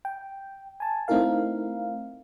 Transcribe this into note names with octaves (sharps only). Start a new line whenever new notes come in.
G5
G#5 A5
A3 C4 D#4 E4 A#4 F5